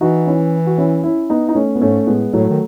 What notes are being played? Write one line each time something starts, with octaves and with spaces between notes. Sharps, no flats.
E3 D#4 F#4
C#4 E4
F#4
C#4 E4
C#4 E4
B3 D#4
D#4
A3 C#4
B3
G#2 A3 C#4
A2 G#3 B3
A2 F#3 A3
D#3